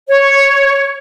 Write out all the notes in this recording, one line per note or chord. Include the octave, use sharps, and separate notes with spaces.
C#5